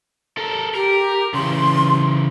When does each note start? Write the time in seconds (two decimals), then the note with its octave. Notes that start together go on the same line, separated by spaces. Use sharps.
0.38 A4 A#4
0.75 G4 A#4
1.34 C#3 E3 C6